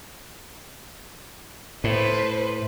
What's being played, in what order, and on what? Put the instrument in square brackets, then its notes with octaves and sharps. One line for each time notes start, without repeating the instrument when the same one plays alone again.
[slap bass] A2 [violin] B4 C5